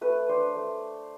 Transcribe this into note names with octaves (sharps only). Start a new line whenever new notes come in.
A3 B4
D4 C5
A3